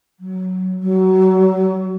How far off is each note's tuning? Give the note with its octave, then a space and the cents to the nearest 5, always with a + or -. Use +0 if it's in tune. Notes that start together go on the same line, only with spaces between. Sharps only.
F#3 +10
F#3 +20